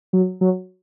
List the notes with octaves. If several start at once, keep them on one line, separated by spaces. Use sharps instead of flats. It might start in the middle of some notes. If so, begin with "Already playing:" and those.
F#3
F#3